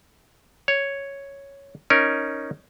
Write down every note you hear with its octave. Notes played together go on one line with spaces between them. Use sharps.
C#5
C#4 D#4 A#4